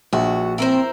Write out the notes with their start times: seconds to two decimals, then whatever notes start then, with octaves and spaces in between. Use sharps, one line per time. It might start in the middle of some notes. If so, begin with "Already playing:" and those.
0.13 A#1 F#4
0.58 C4 E4 A#4 C5